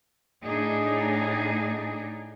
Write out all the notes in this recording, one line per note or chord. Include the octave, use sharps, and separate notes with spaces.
A2 D4 D#4 G#4